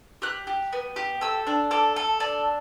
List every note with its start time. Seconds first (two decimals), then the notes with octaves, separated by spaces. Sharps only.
0.22 G4 F#6
0.47 G4
0.73 B3
0.96 G4
1.21 A4 E6
1.47 D4
1.71 A4 D6
1.96 A4
2.20 D4